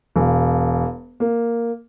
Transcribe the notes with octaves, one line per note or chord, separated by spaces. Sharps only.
E1
A#3